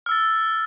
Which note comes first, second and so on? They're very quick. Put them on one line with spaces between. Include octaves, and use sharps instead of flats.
F6 E6 A6